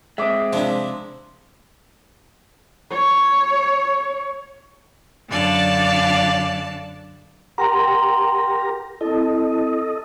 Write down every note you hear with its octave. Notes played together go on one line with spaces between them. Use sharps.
G#3 C4 E5 D6 D#6
C3 F3 D4 E4
C#5
F#2 D3 D5 F5 A5
G4 A#4 F#5 G5 A#5 C6
C4 E4 A4 D#5